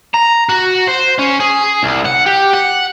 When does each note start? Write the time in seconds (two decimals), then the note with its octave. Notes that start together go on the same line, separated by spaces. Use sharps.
0.14 A#5
0.49 F#4
0.87 C5
1.18 C#4
1.40 G#4
1.83 C2
2.05 F#5
2.26 G4
2.54 F#5